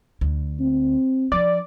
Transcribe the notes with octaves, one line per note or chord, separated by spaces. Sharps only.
D2
C4
F3 D4 D5